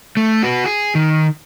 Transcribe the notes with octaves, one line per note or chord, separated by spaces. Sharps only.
A3
F#4 B4
G#4
D#3